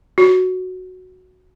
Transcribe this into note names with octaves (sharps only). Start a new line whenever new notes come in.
F#4